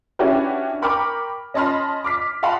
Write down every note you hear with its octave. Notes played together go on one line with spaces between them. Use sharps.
C#4 D4 E4 F#4 G4 B4
A#4 G5 B5 C#6 D6 F6
C#4 D#5 A5 B5 C6 F6
D6 F6 B6
D#5 F5 F#5 A5 B5 C6